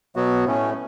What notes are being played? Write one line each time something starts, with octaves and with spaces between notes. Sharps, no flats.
B2 F#3 B3 F#4
A2 A3 C#4